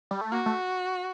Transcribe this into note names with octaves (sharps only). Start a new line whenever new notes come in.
G3
A3
A#3 F#4
A3